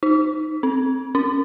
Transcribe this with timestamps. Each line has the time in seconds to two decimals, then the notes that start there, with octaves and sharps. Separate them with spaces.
0.03 D#4
0.63 C4
1.15 C#4